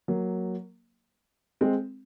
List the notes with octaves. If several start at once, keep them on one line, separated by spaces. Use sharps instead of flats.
F#3 A#3
G#3 C4